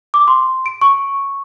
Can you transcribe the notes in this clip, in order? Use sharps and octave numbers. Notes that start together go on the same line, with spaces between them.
D6
C6
D7
C#6